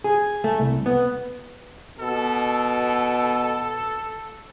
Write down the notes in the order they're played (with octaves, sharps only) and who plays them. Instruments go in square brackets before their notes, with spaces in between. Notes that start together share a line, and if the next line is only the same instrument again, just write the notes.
[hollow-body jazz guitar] G#4
A3
C2
B3
[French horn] B2 [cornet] A4